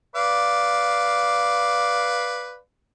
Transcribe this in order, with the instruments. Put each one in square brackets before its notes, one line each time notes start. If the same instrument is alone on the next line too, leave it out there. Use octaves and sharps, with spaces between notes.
[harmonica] B4 D5 F5